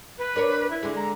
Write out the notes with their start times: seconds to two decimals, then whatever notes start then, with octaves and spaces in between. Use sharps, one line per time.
0.18 B4
0.36 D4 A#4 C#5
0.70 E4
0.83 D3 G#3
0.96 A#5